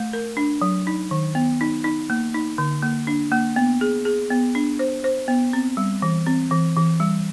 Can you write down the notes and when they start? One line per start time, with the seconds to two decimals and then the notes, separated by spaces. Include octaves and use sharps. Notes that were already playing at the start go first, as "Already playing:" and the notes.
Already playing: A3
0.13 A#4
0.37 D4
0.62 F#3
0.87 D#4
1.11 D#3
1.35 B3
1.61 D#4
1.84 D#4
2.10 A#3
2.34 D#4
2.58 D3
2.82 A#3
3.07 D4
3.31 A#3
3.56 B3
3.81 G#4
4.05 G#4
4.31 B3
4.55 D4
4.79 C5
5.04 C5
5.28 B3
5.53 C4
5.77 G3
6.02 E3
6.27 C4
6.51 E3
6.77 E3
7.00 G3